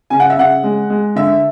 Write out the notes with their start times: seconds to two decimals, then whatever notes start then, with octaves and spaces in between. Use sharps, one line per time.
0.10 C#3 G#5
0.20 F#5
0.30 E5
0.37 C#3 F#5
0.64 G#3
0.90 G#3
1.16 D3 E5